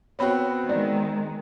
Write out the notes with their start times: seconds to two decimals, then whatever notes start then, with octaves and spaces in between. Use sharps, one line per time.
0.19 B3 C4 F#4 C#5 B5
0.69 D#3 G#3 D5